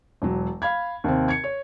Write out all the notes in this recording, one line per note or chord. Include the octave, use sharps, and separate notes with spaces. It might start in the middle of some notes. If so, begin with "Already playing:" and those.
E1 F#3
F5 B5 G#6
D#2 C3 C4
G#6 C#7
C#5